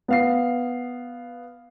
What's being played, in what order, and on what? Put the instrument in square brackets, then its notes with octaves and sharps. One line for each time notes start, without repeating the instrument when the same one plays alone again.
[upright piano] B3 F5 C7